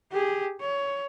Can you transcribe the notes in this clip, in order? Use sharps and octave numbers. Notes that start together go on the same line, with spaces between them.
G4 G#4
C#5